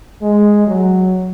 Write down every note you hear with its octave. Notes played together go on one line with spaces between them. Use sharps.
G#3
F#3